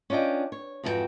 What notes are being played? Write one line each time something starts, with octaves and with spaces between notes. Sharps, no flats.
C#4 D4 F4 D#5 G5
C#5
F2 G#2 E3 F4 F#4 G5